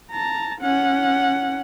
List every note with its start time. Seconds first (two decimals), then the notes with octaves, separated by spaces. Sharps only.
0.11 A5 A#5
0.61 C#4 F#5